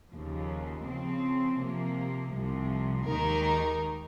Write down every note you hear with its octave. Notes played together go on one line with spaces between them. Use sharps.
D#2 C#3 F3
C#3 F3 C4
C3 F3 A#3
C2 C3 F3
D#2 D#3 G#3 D#4 A#4